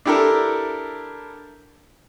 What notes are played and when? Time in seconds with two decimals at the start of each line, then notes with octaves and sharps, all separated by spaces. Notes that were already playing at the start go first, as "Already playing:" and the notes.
0.05 D4 E4 G4 A4 A#4